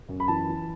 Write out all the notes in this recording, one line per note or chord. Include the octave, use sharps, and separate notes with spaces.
F#2
B5
E3 A5
E3